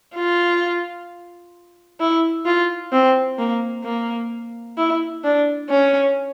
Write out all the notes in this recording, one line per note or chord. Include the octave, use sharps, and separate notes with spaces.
F4
E4
F4
C4
A#3
A#3
E4
D4
C#4